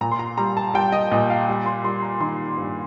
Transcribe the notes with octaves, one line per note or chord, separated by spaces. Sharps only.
A#2 A#5
C6
A#5
G3 A#5
A5
G3 G5
D#5
A#2 D#5
F5
G3
C6
G3 C6
A#5
D#3 C6
G2